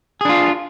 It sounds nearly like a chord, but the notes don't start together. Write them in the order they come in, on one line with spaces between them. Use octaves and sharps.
G#4 D4 F4